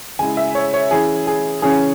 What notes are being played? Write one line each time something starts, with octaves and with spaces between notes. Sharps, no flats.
C#3 G#3 E4 G#5
E5
C#5
C#5
E3 C#4 E4 G#4
G#4
C#3 E3 C#4 G#4